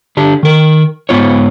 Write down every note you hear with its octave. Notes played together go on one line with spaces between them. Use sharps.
D3 D4 G4
D#3 A#4
G#2 B3 F4 C#5